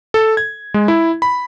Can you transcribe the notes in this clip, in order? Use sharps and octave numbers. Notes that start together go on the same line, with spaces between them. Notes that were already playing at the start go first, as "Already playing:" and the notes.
A4
G#6
G#3
E4
B5